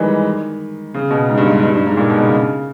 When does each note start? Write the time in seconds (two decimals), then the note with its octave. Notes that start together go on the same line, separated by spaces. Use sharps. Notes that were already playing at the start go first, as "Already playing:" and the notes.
Already playing: D#3 E3 G3 G#3
0.94 C#3
1.11 B2
1.29 G#2
1.38 G2
1.45 G#2
1.63 G2
1.74 G2
1.86 G#2
1.97 A#2
2.10 B2
2.20 C#3